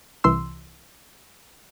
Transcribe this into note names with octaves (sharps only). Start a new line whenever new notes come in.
C2 E3 C6 E6